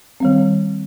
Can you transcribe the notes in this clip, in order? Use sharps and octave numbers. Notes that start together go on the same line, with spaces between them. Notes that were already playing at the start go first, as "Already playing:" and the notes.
D#3 G3 C4